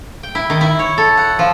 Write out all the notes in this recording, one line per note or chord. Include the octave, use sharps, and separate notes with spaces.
G5
E4
D#3
E4
C#5
A4
F#5
F3